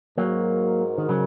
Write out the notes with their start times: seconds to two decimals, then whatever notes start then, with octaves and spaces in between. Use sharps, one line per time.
0.18 G#2 F#3 G#3 A#3 F#4 A#4
0.98 D#3
1.09 C#3 F#3